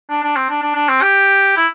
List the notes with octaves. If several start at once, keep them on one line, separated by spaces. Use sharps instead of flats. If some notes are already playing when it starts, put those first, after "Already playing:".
D4
D4
C4
D4
D4
D4
C4
G4
E4